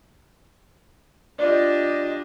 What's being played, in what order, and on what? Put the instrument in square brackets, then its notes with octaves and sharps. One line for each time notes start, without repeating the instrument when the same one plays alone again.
[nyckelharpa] D4 G4 [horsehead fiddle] F4 D#5 [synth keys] D5